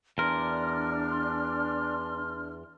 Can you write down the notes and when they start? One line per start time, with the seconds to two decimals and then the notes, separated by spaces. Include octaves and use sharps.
0.18 E2 D4 A#4 C6 F6
1.10 C6